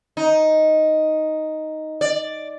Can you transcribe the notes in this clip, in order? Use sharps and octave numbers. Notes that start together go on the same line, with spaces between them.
D#4
D5